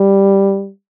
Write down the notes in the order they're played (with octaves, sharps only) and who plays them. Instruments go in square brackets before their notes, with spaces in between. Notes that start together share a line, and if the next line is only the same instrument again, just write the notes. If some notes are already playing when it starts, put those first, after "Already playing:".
Already playing: [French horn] G3